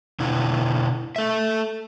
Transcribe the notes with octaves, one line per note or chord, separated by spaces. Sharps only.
B2 D3 E4
A4 E5